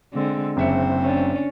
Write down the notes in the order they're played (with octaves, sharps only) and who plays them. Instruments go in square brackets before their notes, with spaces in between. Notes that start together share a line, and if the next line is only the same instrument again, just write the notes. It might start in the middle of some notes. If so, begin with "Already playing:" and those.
[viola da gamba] D3 G#3 C4
[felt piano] F#1 E5 C#7 [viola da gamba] C#3 [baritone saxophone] C4
[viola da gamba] C#4 D4